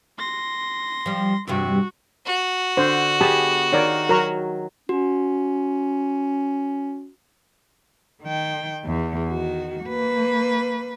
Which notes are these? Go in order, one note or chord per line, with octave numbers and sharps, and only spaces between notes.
C6 A#6
F3 G3
E2 G2 C3 F#4
F#4
D3 C5
B3 G4 G#4 A5
D#3 A#4 C#5 D5 F5
F#3 A#4 A#5 C#6
C#4 F#4
D#3 G5
E2
D#3 F#4
A#3 B4